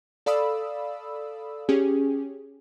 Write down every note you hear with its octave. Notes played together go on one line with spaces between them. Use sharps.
A4 D5 F5 B5 D#6 E6
C#4 G4 G#4